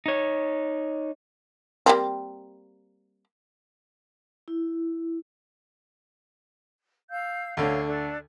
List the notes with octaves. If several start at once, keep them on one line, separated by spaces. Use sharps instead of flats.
D#4 C#5
G3 A#3 C4
E4
F5 E6 G6
D2 D3 C#5 F5
D4 A4